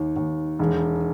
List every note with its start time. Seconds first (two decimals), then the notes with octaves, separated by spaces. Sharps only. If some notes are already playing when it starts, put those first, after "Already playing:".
Already playing: D#2
0.16 D#2
0.59 E1